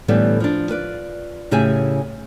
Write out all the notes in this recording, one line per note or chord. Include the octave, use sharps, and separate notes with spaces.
A2 D3 E3 G3 A3 B3
F3 D4
F4 B4 D5
A2 C#3 G4 G#4 E5 G#5